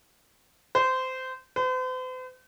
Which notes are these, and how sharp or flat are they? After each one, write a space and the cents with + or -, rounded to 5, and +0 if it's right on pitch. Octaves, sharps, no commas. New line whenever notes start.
C5 -20
C5 -45